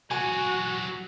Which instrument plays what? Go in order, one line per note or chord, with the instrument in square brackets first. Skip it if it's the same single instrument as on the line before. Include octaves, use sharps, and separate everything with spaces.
[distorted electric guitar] F#3 G4 [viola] F#4 [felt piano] G#5